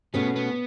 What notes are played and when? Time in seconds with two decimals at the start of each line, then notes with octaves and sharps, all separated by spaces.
0.14 B2 A3 B3 C#4 G#4
0.36 B3